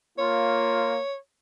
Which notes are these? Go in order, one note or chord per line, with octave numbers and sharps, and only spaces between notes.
A#3 F4 C#5